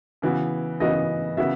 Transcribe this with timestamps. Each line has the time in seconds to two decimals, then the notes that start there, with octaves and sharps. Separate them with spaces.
0.22 C#3 E3 B3 F#4
0.80 C#3 E3 B3 F#4 D#5
1.37 C#3 E3 B3 F#4 E5